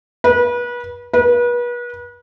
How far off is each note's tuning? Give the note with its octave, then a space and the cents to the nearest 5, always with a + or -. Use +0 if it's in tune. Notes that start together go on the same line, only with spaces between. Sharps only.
B4 -30
B4 -35